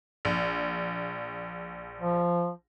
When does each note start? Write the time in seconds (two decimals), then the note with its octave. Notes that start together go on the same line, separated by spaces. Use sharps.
0.25 A#1
2.01 F3